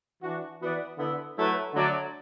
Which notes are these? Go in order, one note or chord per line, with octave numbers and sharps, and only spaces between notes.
E3 D4 F#4
E3 B3 F#4 B4 D5
D3 B3 E4
F#3 A3 E4 B4
D3 F#3 A3 F#4 D5